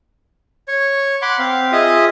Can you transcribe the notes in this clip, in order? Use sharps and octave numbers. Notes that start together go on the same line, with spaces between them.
C#5 C#6
F#5 B5 C6 D6
C4 F5
F4 G#4 D#5 E5 D#6